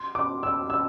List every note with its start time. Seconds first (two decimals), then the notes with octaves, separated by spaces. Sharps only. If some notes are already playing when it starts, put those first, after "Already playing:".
Already playing: C6
0.15 D6
0.43 E6
0.70 E6